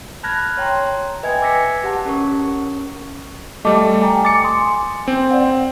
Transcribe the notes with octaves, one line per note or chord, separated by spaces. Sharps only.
A5 B5 F6 F#6 G#6 A#6
C#5 G5 A#5 C6
B4 D#5 E5 G5 G#5 G#6
D6 E6 G#6 A#6 B6 C#7
G4 F#5 A5
C#4 A#4 C#6
G3 A3 D#5 A5 D6
G5 G#5 A#5
D6 A6 C#7
G#5 C6 D#6
C4
D5 F#5